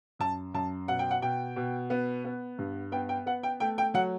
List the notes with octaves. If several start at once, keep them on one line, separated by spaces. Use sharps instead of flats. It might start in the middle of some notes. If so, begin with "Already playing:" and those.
F#2 A5
F#2 A5
B2 F#5
G5
F#5
B2 G5
B2
B3
B3
G2
B3 G5
G5
B3 F#5
G5
A3 G5
G5
F#3 F#5